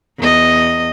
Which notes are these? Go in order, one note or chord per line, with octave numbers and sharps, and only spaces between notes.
E2 D#5